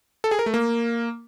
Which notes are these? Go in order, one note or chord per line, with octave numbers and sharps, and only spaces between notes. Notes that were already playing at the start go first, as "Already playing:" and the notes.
A4
G#4
A#4
A3
A#3